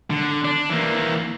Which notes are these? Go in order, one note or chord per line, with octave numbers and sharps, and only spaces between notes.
D3
D4
E3 A#3